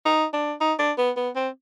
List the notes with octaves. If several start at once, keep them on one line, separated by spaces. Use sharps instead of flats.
D#4
D4
D#4
D4
B3
B3
C4